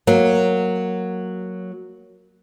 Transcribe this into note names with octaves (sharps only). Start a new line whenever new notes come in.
F#3 A#3